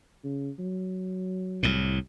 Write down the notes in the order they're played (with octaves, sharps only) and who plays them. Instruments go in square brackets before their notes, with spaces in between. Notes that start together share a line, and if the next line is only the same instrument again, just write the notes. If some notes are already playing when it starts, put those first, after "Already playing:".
[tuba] C#3
F#3
[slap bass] C2 A2